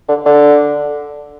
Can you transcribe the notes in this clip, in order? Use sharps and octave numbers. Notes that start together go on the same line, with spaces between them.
D3
D3